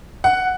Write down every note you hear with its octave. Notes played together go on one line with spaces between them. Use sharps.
F#5